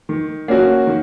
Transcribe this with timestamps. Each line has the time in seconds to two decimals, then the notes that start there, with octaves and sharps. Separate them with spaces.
0.09 D#3
0.48 A#3 C#4 F#4
0.87 D#3